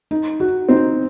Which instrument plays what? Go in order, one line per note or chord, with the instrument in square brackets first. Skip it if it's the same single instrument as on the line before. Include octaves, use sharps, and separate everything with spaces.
[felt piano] D#4
F#4
[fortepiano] C4 [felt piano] D#4